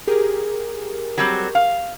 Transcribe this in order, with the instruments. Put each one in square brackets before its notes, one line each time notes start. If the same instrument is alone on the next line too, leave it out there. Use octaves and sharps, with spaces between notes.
[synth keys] G4 G#4 A#4
[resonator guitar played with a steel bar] F#3 G3 C4
F5